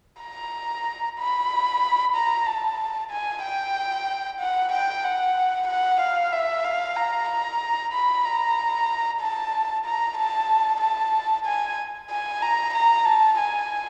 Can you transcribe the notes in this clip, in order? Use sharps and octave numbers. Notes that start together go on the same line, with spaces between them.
A#5
B5
A#5
A5
G#5
G5
F#5
G5
F#5
F#5
F5
E5
F5
A#5
A#5
B5
A#5
A5
A#5
A5
A5
G#5
G#5
A#5
A#5
A5
G#5